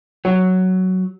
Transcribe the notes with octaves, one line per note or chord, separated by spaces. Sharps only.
F#3